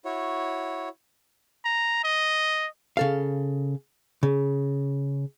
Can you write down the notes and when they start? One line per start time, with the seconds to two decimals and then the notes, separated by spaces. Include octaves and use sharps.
0.05 E4 F#4 C#5
1.65 A#5
2.04 D#5
2.97 C#3 A4 F5
4.23 C#3